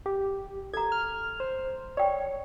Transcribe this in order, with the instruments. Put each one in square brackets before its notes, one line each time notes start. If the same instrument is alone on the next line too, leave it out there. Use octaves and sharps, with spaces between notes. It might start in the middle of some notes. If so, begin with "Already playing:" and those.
[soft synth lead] G4
[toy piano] A4 A#5 [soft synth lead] G#6
[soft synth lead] F6
C5
[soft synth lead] C#5 [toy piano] D5 G5